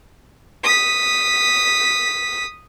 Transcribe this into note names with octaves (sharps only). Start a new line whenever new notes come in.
D#6 B6